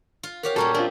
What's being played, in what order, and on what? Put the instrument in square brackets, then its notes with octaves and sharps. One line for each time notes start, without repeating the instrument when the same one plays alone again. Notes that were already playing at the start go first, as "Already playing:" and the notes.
[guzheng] F4
[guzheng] F#4 G4 F5 [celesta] A#4 C#5
[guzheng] A#2 G3 A#3 [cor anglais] C#4 [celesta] F#4 A#5 C#6 [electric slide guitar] A4
[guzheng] C4 [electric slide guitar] D4 F4 [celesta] A#4